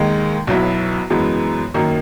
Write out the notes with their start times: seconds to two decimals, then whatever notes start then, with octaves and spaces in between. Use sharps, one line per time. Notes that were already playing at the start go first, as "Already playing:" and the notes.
Already playing: D#2 D#3 G#3
0.47 B1 B2 F#3 B3 E4
1.10 F#2 E3 G#3 B3
1.74 F#2 D#3 A#3